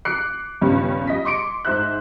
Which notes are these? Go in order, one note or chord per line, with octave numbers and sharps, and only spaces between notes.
D6 F#6 C7 C#7
C#2 G2 D#3 G3 B3 C#4
G3 D#5 B6
C6 D6 C#7 D7
G#2 D#4 C5 E5 F#6